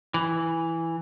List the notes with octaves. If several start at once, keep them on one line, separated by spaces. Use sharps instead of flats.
E3